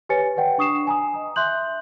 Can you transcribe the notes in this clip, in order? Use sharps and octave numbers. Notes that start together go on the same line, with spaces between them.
G4 B4 C#5 G#5 A6 C#7
B4 D5 F#5 G5
D4 C#6 D#6 C7 E7
G#5 A#5 D#6
D#5 A#5
E5 C6 F#6 G6 F#7